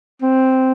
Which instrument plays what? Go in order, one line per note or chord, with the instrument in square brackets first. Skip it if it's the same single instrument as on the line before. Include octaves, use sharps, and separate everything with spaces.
[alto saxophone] C4